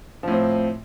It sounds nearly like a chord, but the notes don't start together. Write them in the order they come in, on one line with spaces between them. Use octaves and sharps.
F3 A2 C4